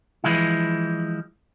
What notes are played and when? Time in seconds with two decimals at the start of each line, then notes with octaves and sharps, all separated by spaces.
0.24 E3 F3 G#3 E4